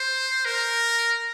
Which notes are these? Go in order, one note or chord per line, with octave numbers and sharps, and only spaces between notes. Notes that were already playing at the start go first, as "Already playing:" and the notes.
Already playing: C5
A#4